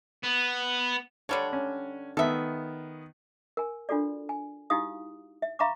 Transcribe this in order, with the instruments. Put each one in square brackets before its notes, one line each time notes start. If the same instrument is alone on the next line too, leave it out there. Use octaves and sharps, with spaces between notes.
[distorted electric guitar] B3
[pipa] D3 G3 D4 [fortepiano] C#5
[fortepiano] C#4
[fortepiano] D#3 B3 [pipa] A4 E5
[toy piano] A#4 G#5
D4 F4 F#4 A4 D5
G#5
D#4 E4 F#4 G4 F5 D#6
E5
E5 F5 A#5 B5 C#6 D6